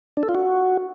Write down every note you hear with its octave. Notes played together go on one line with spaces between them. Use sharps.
D4
A4
F4
F#4